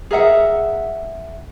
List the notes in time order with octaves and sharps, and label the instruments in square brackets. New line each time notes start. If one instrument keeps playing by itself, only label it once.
[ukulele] G#4 A#4 E5 F#5